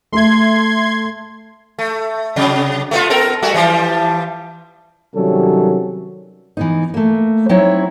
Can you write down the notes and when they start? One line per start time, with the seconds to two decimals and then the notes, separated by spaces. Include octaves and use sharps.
0.12 A3 A4 E5 C6 G#6
1.79 A3
2.36 C3 F#3
2.91 A3 B3 F4
3.10 B3 A4 A#4
3.42 G3 A3 F#4
3.54 E3 F3 G3
5.15 C3 D#3 F#3 G3 C#4 A4
6.57 E3 B3 D#4
6.94 A3 A#3
7.49 F#3 C4 D#4 E4 C#5